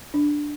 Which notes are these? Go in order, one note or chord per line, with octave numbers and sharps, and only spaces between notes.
D4